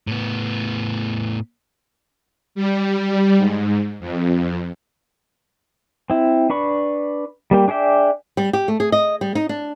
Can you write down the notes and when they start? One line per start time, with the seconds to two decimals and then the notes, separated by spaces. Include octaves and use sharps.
0.07 A2 B3
2.55 G3
3.38 G#2
4.00 F2
6.10 C4 E4
6.50 D4 B4 B5 C#6
7.51 G3 A#3 G4
7.68 D4 G#4 D5 E5 G5
8.37 G3
8.53 G4
8.68 A3
8.80 G#4
8.92 D#5
9.21 G3
9.35 D#4
9.49 D4